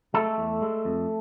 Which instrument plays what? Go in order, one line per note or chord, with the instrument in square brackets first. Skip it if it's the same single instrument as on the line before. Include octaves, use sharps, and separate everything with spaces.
[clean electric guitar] G#3 A3 A4
E2
G#3
F2